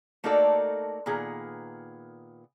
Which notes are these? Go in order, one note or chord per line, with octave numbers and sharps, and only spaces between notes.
A3 A#3 D#4 F#4 A4 D5
A#2 D#3 B3 G#4